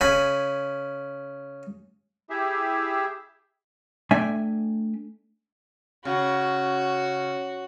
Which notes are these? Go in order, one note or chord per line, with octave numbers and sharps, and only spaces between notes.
C#3 G#5 B5
E4 G4 G#4 E5
A3 D4 E5 G5 G#5
C#3 F#4